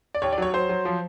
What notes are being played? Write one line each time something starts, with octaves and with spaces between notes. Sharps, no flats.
D5
D#2 C#5
D5
F#3 C#5
F#3 C5
F#3
F3